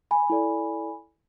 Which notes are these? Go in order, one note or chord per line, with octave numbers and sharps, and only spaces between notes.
G#5 B5
E4 A4 D5